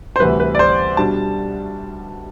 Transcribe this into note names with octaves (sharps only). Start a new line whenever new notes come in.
C5
D2 C3 E3 G3 B4
B4
D5
C5
B2 G3 D4 A5